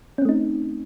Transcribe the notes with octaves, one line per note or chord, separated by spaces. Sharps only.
A3 C4 C#4 D#4